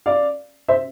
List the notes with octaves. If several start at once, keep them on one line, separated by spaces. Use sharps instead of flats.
D5 F5
C5 E5